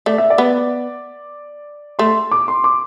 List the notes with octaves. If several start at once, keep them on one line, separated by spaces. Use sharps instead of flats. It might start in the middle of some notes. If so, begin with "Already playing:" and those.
A3 D5
E5
D5
B3
A3 C6
D6
C6
D6